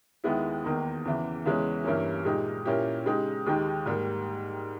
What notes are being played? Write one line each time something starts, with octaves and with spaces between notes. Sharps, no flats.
D#2 D#3 G#3 B3 E4
E2 D#3 A#3 D#4
E2 C#3 E3
E2 C#3 E3 G#3 C#4
G2 E3 A#3 C#4
A#2 G#3 D#4 G4
A#2 A#3 C#4 E4 G4
C#3 G#3 D#4 G4
D#2 D#3 G#3 D#4 G4
G#2 G3 A#3